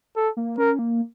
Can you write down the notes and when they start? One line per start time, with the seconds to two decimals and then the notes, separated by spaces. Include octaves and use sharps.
0.16 A4
0.37 A#3
0.58 C#4 A#4
0.79 A#3